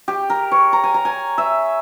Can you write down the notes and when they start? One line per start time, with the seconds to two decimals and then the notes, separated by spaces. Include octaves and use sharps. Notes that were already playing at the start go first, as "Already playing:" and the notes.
0.08 G4
0.30 A#4
0.52 C#5
0.73 A#5
0.84 G#5
0.94 A#5
1.05 G#5
1.38 E5